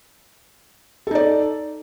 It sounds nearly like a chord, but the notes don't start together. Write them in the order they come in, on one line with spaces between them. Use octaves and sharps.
A4 D#4 D5